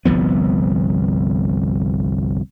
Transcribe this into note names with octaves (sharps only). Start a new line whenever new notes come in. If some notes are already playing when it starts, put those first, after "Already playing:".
G1 C2 F3 B3